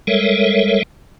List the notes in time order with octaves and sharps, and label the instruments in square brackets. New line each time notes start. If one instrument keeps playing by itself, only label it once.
[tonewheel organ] G3 G#3 A4 A#4 C#5 E5